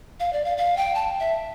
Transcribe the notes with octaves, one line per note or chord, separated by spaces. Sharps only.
F5
D5
F5
F5
G5
A5
E5